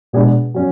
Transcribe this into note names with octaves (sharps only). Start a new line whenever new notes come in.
B2 G#3 D4 G#4 B4
F#3 C#4